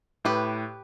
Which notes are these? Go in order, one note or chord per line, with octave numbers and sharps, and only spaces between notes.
A2 G4 B4